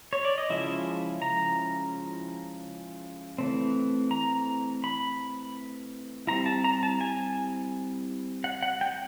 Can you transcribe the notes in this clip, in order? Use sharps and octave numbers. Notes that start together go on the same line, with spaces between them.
C#5
D5
D#5
C#3 F3 G#3 C#4 E4 E5
A#5
E3 A3 C4
A#5
B5
G3 C4 E4 A#5
A5
A#5
A5
G#5
F#5
F#5
G5